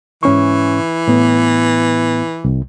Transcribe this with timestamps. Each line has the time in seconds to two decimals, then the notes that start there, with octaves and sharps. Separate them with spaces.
0.23 G#2 E3 C#4 C#6
1.08 A2 B3
2.45 C2